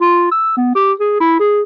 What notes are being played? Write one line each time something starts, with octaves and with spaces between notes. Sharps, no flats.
F4
E6
B3
G4
G#4
E4
G#4